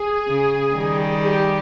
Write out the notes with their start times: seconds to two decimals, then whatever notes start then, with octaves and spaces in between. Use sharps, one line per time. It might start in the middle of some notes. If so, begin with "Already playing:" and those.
Already playing: G#4
0.28 C#3
0.76 D#3 G3
1.24 G4